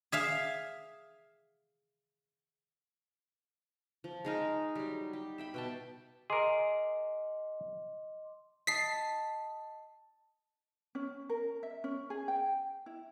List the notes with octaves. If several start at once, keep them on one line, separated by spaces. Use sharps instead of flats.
G#4 E5 F5
F3
G#3 D#4 A#4
F#3 G3
G4
E5 G5 B5
B2 G5 A5
G#4 A#4 D#5 C6 D6
D#5 A5 B6 C7
C#4
A#4
E5
C#4
G#4
G5
E4